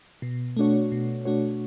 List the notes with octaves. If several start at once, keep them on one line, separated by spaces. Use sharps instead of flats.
B2
A3 D4 F#4 C#5
B2
A3 D4 F#4 C#5